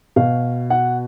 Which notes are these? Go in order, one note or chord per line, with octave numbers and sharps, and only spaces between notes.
B2 F5
F#5